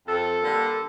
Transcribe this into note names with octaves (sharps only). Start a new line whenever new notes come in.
F2 A4
D3 G3 A#3